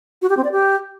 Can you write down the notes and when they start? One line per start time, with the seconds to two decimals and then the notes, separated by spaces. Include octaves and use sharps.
0.22 F#4
0.29 G4
0.37 C4
0.44 D5
0.52 G4